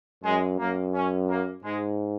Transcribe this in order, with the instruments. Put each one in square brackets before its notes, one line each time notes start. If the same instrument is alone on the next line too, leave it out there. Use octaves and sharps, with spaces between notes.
[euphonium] F#2 [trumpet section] G#3
[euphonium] F#2 [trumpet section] A#3
[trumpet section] C#4
A#3
[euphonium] G#2 [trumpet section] G#3